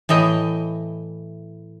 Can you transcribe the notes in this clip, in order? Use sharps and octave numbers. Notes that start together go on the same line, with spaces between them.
A2 E3 D#5 G5